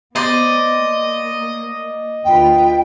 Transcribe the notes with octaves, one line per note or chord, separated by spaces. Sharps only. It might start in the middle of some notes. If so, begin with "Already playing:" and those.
B3 C5 D5 D#5
A#3
D2 F4 B4 G5